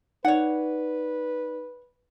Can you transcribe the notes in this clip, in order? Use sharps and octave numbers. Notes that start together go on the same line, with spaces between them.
D#4 B4 C#5 D5 F#5